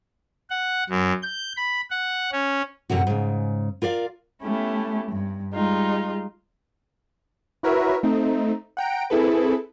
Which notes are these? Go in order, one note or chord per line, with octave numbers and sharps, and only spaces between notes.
F#5
F#2
G6
B5
F#5
C#4
F#2 A2 C3 F#4
G#2 C#3
F4 A#4 D5 F5
A3 B3 C#4 E4 G4
G2
G3 G#3 D#4 F4
E4 F#4 A#4 B4 C#5 E5
A3 C4 D#4
F#5 G5 A#5 D7
C4 E4 G#4 A4 B4